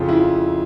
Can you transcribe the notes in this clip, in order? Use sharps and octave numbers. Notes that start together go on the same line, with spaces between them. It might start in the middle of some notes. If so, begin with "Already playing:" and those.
Already playing: F2 C#3 F3 F4
E4
F4